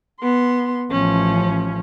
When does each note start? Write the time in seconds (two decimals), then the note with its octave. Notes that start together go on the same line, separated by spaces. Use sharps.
0.21 B3 C6
0.91 A1 F3 C#4